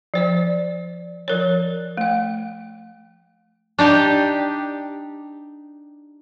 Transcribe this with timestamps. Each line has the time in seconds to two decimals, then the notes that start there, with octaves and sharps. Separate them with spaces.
0.14 F3 C5 D5
1.28 F3 A#4 C#5
1.97 A3 G5
3.79 D4 D#4 G4